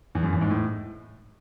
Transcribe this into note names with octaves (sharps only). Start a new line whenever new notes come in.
E2
F#2
E2
G#2
A2